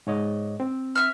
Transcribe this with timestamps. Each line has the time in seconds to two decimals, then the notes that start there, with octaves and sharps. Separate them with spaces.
0.07 G#2 C#5 D#5
0.60 C4
0.95 E5 E6 F6